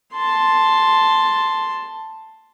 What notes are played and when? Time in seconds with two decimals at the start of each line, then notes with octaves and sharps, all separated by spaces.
0.13 A5 C6